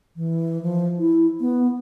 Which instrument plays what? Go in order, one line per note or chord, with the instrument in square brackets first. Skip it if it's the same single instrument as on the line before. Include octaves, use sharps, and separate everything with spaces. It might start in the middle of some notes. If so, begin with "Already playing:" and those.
[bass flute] E3
F3
E4
B3